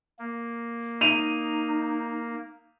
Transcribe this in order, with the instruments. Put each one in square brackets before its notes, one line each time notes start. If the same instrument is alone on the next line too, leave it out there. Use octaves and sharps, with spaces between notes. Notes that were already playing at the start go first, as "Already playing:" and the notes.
[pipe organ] A#3
[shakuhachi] D#4 [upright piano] D#7 F7